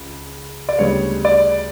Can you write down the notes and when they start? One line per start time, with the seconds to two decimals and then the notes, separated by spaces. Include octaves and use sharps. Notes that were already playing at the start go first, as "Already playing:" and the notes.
Already playing: C#2
0.69 D5
0.79 D2 C#3 G3 B3 C#5
1.25 D5